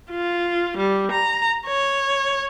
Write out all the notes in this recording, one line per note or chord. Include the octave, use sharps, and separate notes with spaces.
F4
G3
A#5
C#5